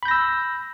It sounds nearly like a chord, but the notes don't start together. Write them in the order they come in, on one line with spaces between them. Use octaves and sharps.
B5 G6 A#6 E6